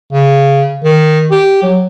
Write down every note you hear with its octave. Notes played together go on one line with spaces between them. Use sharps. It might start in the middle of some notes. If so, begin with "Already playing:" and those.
C#3
D#3
G4
F#3